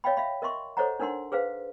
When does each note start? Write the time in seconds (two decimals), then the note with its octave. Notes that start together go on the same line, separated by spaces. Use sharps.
0.04 C#5 D#5 F5 G5 B5
0.17 E5 F5 B5
0.42 A#4 D#5 E5 C6 C#6
0.77 A4 C5 C#5 D#5 F#5 A#5
1.00 D4 D#4 A#4 F#5 C6
1.32 G#4 B4 C5 F5